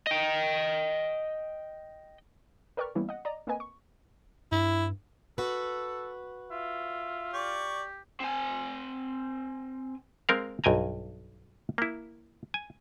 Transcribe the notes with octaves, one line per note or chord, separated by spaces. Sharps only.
D#5 G5
A#4 B4 D5 G5 C#6 F6
E3 G3 A#3 B3 C#4 E4
D#5 F#5
D5 D#5 A#5
A#3 C4 A#4 B4 D#5 G#5
C#6
G2 E4
F#4 A4 B4
F4 E5
G4 D5 C#6
C4 G#5
G#3 C4 A#4 F5
B1 G2 G5 G#5 A#5
A#3 E4
G#5